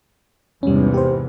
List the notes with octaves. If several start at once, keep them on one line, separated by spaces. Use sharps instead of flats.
E2 G#2 C3 G3 C#4
G4 C5